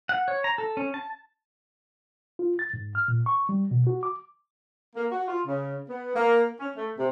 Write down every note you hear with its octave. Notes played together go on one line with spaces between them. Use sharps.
F#5
C#5
A#5
A4
C#4
A5
F4
A6
G#2
F6
A#2
C#6
G3
B2
F#4
D6
A#3
F#4
F4
C#3
B3
A#3
C#4
A3
C3